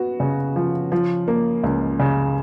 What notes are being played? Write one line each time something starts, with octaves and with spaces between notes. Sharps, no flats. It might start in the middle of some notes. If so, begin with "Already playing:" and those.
Already playing: B3 F#4
C#3
F3
F3
A#3
C#2
C#3